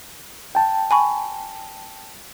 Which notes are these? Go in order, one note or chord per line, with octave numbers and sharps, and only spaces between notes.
G5 A5
G#5 B5 C#6